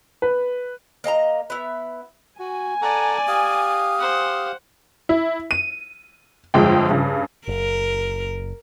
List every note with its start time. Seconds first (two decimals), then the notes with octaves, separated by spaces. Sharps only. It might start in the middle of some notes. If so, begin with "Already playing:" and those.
0.22 B4
1.04 A#3 D#5 A5 A#5
1.50 B3 E4
2.39 F#4 G#5
2.82 A4 D5 F#5 A#5
3.28 G4 F5 D#6
4.00 C5 F#5
5.09 E4
5.51 D#7
6.54 G1 F2 G#3 G5
6.90 G2 C#3
7.48 F#1 A#4